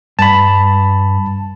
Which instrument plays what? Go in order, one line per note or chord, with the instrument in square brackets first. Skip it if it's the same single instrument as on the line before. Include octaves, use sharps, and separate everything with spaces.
[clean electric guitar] G2 [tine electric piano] A5 B5